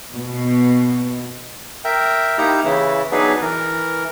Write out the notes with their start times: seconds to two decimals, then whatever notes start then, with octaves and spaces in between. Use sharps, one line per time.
0.14 B2
1.85 A#4 E5 G5
2.38 A#3 D#4 E4 G4 A#5
2.64 C#3 E3 E4
3.12 F#3 B3 D4 D#4 G#4 B4
3.41 E3 A#4